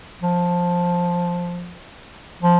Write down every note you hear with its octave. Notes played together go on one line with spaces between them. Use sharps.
F3
F3